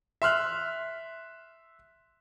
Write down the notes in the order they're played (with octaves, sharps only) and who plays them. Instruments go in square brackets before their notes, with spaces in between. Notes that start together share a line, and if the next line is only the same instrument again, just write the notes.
[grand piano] E5 C6 F6 F#6